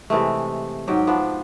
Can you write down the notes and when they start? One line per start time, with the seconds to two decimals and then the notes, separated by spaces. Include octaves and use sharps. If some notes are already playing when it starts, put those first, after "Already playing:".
0.10 C3 E3 G#3 A3
0.87 G#2 F#3 G4 G5
1.07 F3 B3 D4